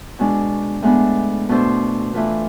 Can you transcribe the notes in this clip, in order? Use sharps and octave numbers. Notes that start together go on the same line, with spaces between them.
B2 G#3 D4
A2 G#3 B3 D4
B2 A3 D4 A4 C5
E3 A3 D4 F4 B4